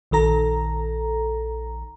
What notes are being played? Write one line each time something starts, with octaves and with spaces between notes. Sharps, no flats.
A#1 D#3 A4 A#5